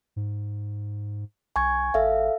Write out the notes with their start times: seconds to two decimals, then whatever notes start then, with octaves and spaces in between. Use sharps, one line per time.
0.16 G#2
1.56 B1 G#5 C#6 G#6
1.94 G#1 A4 E5 F5